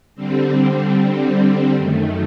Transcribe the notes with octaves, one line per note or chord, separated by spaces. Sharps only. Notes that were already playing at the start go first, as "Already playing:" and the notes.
D3 G3 C4
F#2 D#3 A3